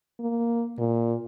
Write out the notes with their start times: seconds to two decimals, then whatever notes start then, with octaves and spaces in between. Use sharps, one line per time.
0.19 A#3
0.79 A#2